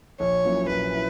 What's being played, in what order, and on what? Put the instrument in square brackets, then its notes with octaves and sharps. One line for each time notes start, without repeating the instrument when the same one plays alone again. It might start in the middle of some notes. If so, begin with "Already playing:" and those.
[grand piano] A#1 [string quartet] C#5
[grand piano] A#2 F#3 C#4 E4
[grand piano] A#1 [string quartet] B4
[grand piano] E4